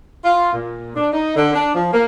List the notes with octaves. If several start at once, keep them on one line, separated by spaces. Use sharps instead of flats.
F4
A#2
D4
D#4
D3
D4
F3
A#3